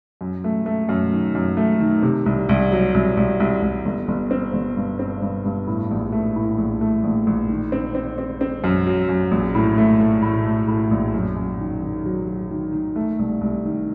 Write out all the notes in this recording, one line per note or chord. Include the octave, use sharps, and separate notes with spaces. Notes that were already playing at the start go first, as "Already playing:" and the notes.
F#2
A3
A3
F#2
D#3
F#2
A3
D#3
C3
C2
C2
F#3
C2
C2
C2
C2
G1
G1
C4
G1
G2
C4
G2
G2
A2
A#1
A3
A2
A#1
A3
A#1
A#1
D#3
C4
C4
C4
C4
F#2
F#3
F#2
A#1
A2
A3
A3
A2
A3
A2
A#1
F#2
F#2
D#3
D#3
F#3
F#3
D#3
D#3
A3
C2
C2
D#3